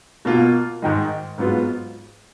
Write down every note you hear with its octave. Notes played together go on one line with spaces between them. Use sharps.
B2 A#3 F4
G#2 D#3 G#3 D#4
G#2 F#3 B3 F4